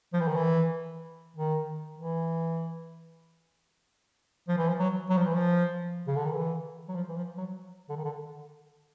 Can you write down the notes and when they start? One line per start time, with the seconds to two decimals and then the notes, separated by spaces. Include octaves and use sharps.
0.13 F3
0.21 E3
0.28 D#3
0.36 E3
1.37 D#3
1.99 E3
4.48 F3
4.58 E3
4.68 F3
4.79 F#3
5.10 F#3
5.17 F3
5.26 E3
5.34 F3
6.07 C#3
6.16 D3
6.25 D#3
6.34 E3
6.89 F#3
6.95 F3
7.09 E3
7.17 F3
7.38 F#3
7.89 D3
7.97 D#3
8.05 D3